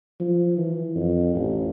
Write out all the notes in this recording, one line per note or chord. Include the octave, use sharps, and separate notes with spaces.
F3
E3
F2
A1